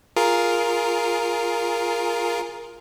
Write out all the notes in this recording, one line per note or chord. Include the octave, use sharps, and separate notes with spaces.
F4 G#4 A#4